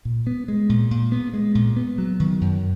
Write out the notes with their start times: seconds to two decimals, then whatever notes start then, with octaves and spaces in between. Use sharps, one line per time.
0.05 A#2
0.27 B3
0.48 G#3
0.69 A#2
0.91 A#2
1.12 B3
1.33 G#3
1.55 A#2
1.76 B3
1.98 F#3
2.20 D#3
2.41 F#2